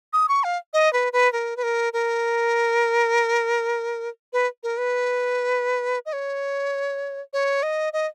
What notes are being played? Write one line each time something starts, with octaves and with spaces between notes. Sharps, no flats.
D#6
C#6
F5
D#5
B4
B4
A#4
B4
A#4
A#4
B4
A#4
B4
D#5
C#5
C#5
D#5
D#5